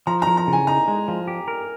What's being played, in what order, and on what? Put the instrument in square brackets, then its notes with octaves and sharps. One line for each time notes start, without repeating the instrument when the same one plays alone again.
[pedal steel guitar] F3 [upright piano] A#5
[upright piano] A#5
[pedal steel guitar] F3
[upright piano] A#5
[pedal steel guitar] C#3
[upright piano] G#5
[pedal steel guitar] D#4 [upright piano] A#5
[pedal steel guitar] G#3
F3
G4
A#4